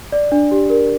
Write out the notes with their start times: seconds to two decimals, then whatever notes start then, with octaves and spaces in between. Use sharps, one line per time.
0.12 D5
0.32 D4
0.51 G4
0.70 A#4